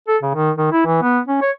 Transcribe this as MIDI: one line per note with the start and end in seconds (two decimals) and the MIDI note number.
0.08 0.17 69
0.22 0.33 49
0.35 0.51 51
0.58 0.68 51
0.72 0.83 64
0.86 1.02 52
1.02 1.19 59
1.28 1.40 61
1.42 1.51 73